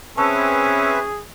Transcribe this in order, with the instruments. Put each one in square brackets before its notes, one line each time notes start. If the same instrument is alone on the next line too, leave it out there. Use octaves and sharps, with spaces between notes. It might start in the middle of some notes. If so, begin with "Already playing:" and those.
[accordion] C4 B4 E5 [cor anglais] C#4 [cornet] G#4 [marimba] A5 C#6 E6